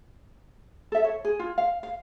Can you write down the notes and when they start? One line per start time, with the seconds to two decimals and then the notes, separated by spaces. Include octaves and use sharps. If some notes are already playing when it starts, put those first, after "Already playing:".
0.92 A4 E5
1.04 C#5
1.25 G#4
1.39 F4
1.58 F5
1.83 F5